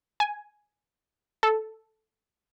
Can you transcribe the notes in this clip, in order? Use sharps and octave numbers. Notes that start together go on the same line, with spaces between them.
G#5
A4